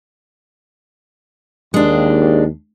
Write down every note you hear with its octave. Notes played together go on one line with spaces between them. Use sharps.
D#2 G#3 D4